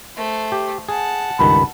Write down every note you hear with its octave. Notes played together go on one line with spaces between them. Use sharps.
A3 C5
G4
G#4 F#5 A5
C#2 G2 D#3 B5